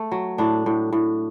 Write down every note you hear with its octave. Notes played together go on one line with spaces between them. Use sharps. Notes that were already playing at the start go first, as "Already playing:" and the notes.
Already playing: A3
F#3
A2 D4
A2
A2